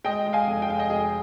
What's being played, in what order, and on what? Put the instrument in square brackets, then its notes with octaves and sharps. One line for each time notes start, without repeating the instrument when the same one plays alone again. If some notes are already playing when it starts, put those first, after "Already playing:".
[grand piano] G#3 D#5 G5
G#3
F5 G#5
F1
G5
G#3 F5
D#5 G5
F1 G#4